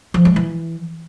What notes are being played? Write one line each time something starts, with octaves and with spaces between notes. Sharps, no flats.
F3
G#3
E3